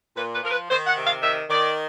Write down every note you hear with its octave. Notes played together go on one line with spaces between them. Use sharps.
A#2 B4
B4
F3 A#4
B4
D#3 C5
F#5
C3
F5
D#3 E5
D#3 D5